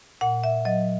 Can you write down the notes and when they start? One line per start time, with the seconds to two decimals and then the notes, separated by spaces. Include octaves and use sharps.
0.21 A#2 F#5
0.44 E5
0.65 F#3 D#5